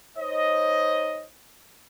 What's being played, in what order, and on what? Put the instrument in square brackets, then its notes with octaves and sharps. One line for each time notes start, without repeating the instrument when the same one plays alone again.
[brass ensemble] D#4 C5 C#5 D#5